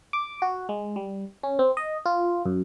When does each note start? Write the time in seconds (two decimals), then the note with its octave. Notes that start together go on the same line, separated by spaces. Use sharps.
0.13 D6
0.42 F#4
0.69 G#3
0.96 G3
1.43 C#4
1.59 C4
1.77 D#5
2.06 F4
2.46 F#2